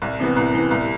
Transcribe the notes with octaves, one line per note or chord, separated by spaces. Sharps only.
C2
C3 E3 B3
C2
C3 E3 B3
C2